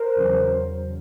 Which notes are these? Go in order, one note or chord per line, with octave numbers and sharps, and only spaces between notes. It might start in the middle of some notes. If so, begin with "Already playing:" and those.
Already playing: A#4 C5
E2 C#3 F#3